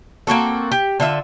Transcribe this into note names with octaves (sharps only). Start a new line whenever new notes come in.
A#3 C4 F#4 A4
G4
D3 F4 E5